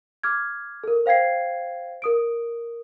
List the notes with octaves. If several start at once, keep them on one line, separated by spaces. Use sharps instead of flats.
D6 F6 G#6
A4 A#4
C5 F5 G5 G#6 C7
A#4 D#6 D7